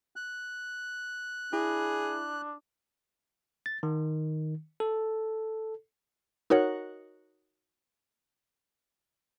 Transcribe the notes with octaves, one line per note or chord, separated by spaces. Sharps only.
F#6
D4 E4 G#4
A6
D#3
A4
D#4 F#4 A#4 C#5 F#5